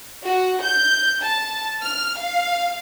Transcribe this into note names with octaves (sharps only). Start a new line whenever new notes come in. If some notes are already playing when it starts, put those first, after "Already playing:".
F#4
G6
A5
F6
F5